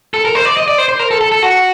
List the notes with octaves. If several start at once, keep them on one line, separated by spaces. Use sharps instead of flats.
A4
A#4
C5
D5
D#5
D5
C5
C5
A#4
A4
A4
A4
F#4